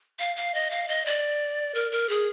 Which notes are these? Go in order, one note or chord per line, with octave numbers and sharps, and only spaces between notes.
F5
F5
D#5
F5
D#5
D5
A#4
A#4
G#4